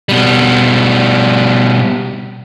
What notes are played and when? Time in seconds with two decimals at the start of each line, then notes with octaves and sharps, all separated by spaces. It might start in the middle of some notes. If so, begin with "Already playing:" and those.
0.09 B2 G3